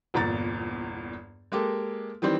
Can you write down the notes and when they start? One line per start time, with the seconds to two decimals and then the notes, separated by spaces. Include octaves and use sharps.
0.14 G1 E2 A#2 A#5 A6
1.52 G#3 A#3 G4 A4
2.22 D#3 E3 G3 C4